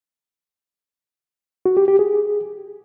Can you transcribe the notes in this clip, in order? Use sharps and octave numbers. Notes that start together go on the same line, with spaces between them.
F#4
G4
G4
G#4